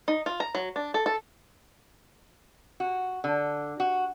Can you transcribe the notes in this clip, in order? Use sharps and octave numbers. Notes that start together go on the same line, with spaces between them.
D#4
F4
A#5
F#3
D4
A4
A4
F#4
D3
F#4